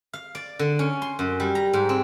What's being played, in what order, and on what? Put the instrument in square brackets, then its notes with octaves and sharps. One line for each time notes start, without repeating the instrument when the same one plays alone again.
[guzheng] F5
D5
D3
C#4
C6
F#2
G3
A#5
G#2
C4